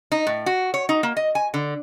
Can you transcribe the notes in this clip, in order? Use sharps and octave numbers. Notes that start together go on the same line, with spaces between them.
D#4
A2
F#4
C#5
D#4
A#3
D#5
G#5
D3